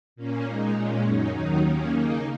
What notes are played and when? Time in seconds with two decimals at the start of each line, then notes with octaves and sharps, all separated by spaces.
0.16 A#2 A#3 C#4
0.44 A#2 G#3 D#4
0.74 A#2 G#3 C#4
1.03 F#2 F#3 D#4
1.33 D#2 D#3 F#3 D#4
1.62 D#2 D#3 A#3 C#4
1.91 C#3 A#3 D#4